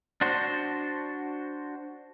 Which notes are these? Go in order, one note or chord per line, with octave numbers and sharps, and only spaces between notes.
D4 F#4 C5